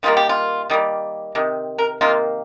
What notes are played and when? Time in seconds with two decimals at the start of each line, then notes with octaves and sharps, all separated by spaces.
0.03 D#3 G3 A#3 F4
0.17 G4
0.29 F4
0.70 D#3 G3 A#3
1.35 C3 D#3
1.78 A#4
2.01 C3 D#3 A#3 F4